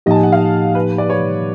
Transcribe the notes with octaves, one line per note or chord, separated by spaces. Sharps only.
A2 F3 A#3 D#4 G4 D#5 A5
G#5
F#5
F5
B4
D5
C#5